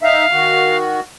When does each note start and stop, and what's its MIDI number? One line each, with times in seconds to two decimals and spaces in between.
0.02 0.26 63
0.02 0.26 76
0.02 0.77 77
0.32 1.00 51
0.32 1.00 66